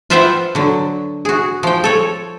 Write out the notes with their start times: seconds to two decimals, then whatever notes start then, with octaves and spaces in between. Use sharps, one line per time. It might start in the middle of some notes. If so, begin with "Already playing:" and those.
0.10 F4 B4 C5 E5 F#5 G5
0.55 D3 F#3
1.25 F#4 G#4
1.63 F3 G5
1.84 A4 C#5